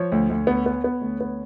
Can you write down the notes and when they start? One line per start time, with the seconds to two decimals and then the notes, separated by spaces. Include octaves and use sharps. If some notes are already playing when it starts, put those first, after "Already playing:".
Already playing: F3 C#5
0.12 D2
0.30 D2
0.47 B3
0.66 B3
0.84 B3
1.01 D2
1.21 B3